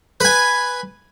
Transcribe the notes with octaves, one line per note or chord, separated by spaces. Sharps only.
B4 G#5